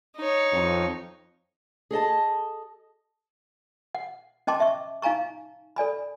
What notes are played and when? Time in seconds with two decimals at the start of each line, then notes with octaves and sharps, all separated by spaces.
0.17 D#4 C#5
0.53 F2
1.91 G#4 A4 D#5 A5
3.95 F#5
4.47 C#4 D#5 G5 A5 C6 D6
4.60 E5 C#6
5.02 D#4 F5 G#5 A#5 C#6
5.76 A4 D5 G#5 B5